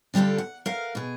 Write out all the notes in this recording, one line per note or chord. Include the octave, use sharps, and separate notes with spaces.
D3 G3 F4 G4 A4
F#5
A#4 F5 F#5
B2 G#4